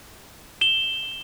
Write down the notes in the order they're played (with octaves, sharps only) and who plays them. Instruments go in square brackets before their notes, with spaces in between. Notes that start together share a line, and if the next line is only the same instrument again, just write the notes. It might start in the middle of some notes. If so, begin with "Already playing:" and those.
[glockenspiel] E7 G7